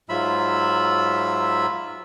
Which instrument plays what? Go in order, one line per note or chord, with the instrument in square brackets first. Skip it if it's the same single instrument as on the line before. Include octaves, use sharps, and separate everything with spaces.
[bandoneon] G#2 F#3 F4 E5 B5 E6